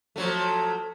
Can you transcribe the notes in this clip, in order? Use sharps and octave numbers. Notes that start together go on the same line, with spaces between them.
F3 F#3 A3